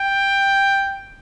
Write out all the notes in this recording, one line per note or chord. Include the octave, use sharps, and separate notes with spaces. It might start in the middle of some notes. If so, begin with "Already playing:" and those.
Already playing: G5